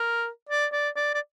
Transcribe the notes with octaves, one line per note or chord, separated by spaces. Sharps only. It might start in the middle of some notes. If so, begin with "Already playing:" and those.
Already playing: A#4
D5
D5
D5
D5